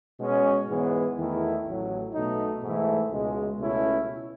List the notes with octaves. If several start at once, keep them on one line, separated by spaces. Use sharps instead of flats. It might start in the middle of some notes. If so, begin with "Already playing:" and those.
B2 G#3 C#4
G#2 E3 G#3 B3
E2 D#3 A3 E4
A1 A2 F#3
B1 B2 A3 D#4
G#2 E3 A3 E4
C#2 B2 G#3
C#2 B2 A3 C#4 E4